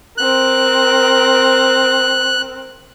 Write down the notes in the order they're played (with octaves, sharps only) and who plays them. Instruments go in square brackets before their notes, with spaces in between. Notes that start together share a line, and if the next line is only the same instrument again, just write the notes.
[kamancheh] C4 A#4 [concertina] F#6